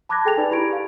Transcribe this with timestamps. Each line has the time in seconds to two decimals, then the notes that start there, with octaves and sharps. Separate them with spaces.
0.09 A5 B5 D6 F#6 G#6 A#6
0.25 G#4 A4 G5 G#5 A6 F7
0.37 D#4 B4 D5
0.51 E4 G4 B5 G#6 D7
0.73 F5